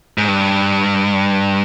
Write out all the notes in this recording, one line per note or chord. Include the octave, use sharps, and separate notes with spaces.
G#2
G2